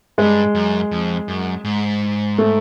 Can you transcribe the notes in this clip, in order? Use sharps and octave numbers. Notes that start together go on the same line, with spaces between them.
G2 G#3
F#2
F2
F#2
G#2
A3